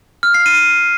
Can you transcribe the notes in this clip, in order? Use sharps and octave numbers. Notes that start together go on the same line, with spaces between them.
F6
C7
D#7